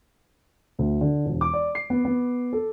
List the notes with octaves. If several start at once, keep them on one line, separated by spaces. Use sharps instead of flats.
D2
D3
E1
D6
D5
C7
B3
B3
A4